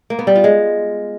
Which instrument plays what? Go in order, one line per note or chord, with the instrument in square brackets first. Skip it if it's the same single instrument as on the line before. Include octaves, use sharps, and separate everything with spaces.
[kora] A#3
B3
G3
F4
G#3